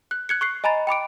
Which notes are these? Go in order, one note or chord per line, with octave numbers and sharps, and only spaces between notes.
F#6
F#6 G#6 C#7
C#6 F#6 C7
D#5 G#5 A#5 B5 A6
G5 B5 D6 D7